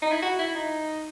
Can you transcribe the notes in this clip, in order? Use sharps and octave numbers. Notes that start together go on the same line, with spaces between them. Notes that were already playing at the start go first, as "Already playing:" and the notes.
D#4
E4
F#4
E4
D#4